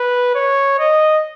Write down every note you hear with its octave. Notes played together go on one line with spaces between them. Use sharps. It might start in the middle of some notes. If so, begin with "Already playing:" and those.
Already playing: B4
C#5
D#5